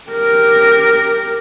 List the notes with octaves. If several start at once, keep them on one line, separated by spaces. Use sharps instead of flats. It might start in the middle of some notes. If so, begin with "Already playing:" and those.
G4 A#4